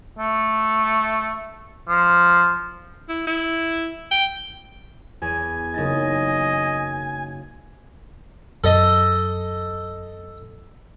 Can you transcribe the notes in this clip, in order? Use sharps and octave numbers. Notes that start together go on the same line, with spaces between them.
A3
F3
E4
E4
G5
E2 G#5
F#1 D#4 D#5 A6
F#2 A4 D#5